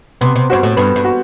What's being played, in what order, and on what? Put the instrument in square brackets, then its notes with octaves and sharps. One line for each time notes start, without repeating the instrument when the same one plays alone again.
[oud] C3 [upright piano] B3
[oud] C3
[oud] G2 [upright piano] F#4 C5
[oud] A2
[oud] G2 [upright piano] B3
[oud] G2
[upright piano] F#4